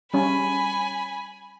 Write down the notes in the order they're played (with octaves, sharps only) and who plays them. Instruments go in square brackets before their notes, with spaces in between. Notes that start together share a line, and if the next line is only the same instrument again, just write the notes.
[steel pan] G3 C#4 [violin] G#5 B5